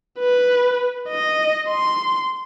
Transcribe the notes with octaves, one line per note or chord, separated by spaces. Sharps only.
B4
D#5
C6